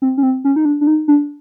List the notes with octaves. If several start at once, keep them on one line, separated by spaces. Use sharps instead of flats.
C4
C#4
C4
C#4
D#4
D4
D4
D#4
D4